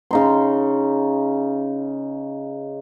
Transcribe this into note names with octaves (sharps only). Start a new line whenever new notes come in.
C#3 D#4 C6